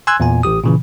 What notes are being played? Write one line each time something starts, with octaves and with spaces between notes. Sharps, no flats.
G#5 C6 E6 F#6 G#6
E2 A#2 G#5
A1 G4 D#6
A#2 C#3 E3